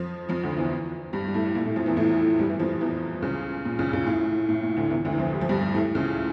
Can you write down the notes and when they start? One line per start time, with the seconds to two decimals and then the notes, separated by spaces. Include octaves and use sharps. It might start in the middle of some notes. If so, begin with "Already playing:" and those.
Already playing: F2 F3
0.29 F2 F3
0.43 D2 D3
0.57 E2 E3
1.13 G2 G3
1.27 G3
1.34 A2 A3
1.55 A#2 A#3
1.65 A2 A3
1.76 F2 F3
1.86 E2 E3
1.97 A2 A3
2.39 G2 G3
2.50 E3
2.60 F2 F3
2.81 E2 E3
3.22 C#2 C#3
3.65 A#2
3.79 C#2 C#3
3.93 C#2 C#3
4.06 A2
4.49 A2
4.63 A#2
4.77 D2 D3
4.91 E2 E3
5.05 D2 D3
5.12 E3
5.18 F2 F3
5.33 G3
5.41 F3
5.49 G2 G3
5.74 A2 A3
5.95 C#2 C#3